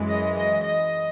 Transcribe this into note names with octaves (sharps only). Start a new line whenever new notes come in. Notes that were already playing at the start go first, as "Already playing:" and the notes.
Already playing: F#2 E3 G#3
D#5
D#5
D#5